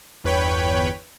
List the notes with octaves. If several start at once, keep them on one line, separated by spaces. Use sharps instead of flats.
G1 E2 B4 C#5 G5 B5